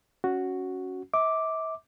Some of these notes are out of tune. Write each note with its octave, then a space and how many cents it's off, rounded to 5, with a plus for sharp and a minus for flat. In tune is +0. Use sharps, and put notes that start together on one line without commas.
C#4 +0 F#4 +0
E5 -40 D6 +0